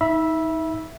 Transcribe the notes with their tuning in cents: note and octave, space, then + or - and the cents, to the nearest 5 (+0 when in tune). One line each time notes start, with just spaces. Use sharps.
D#4 +30 E5 +0 B5 -25